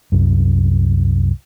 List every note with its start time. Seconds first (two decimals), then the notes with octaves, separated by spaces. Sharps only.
0.12 C2 F#2